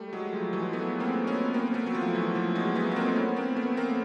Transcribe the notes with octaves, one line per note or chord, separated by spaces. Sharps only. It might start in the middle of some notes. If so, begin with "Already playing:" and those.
Already playing: G3 A3
F#3 G#3
F3 G3
E3 F#3
A3 B3
A#3 C4
B3 C#4
A#3 C4
A3 B3
F#3
F3
E3
F3
F#3 G#3
A3 B3
B3
A#3 C4
C4
B3 C#4
A#3 C4
A3 B3
A#3 C4